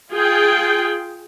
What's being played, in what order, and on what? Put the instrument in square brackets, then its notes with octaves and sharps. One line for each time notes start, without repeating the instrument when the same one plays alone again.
[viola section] F4 G#4 G5